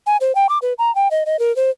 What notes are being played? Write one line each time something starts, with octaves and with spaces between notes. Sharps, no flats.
G#5
C5
G5
D6
B4
A#5
G5
D#5
D#5
A#4
C5